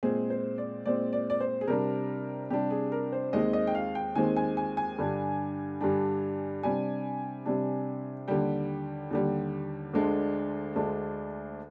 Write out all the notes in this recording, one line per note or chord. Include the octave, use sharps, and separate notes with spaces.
A#2 G#3 C4 G#4
C5
D5
A#2 G#3 C4 D5
D5
D5
C5
G#4
C3 G3 D4 A#4
C3 G3 D4 G4
G#4
A#4
C5
D#2 D#3 G#3 C4 D#5
D#5
G5
F5
G5
D#2 D#3 G#3 C4 G#5
G#5
G#5
G#5
G2 D3 G3 D4
G2 D3 G3 D4
C3 G3 D4 G#5
C3 G3 D4
D#2 D3 G3 G5
D#2 D3 G3
D2 D3 G#3 D4
D2 D3 G#3 D4